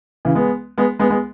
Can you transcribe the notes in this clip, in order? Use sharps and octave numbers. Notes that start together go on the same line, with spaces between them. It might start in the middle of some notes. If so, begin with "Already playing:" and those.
C#3 E3
G#3 B3
G#3 B3
G#3 B3
G#3 B3